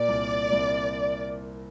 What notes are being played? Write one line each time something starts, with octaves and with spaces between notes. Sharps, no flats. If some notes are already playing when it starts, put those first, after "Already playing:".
Already playing: A#2 D5
C2
C2